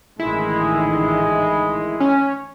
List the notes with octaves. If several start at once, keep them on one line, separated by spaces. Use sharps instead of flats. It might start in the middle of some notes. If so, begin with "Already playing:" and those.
A1 D3 D#3 G#3 E4
C#4